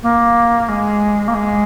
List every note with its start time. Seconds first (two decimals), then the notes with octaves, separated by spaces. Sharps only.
0.02 A#3
0.68 G#3
1.27 A#3
1.34 G#3